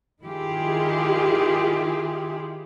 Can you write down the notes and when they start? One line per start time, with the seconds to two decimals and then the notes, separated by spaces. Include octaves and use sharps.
0.24 D#3 E4 F4 G4 G#4